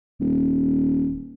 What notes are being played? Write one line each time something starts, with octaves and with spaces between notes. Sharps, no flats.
D#1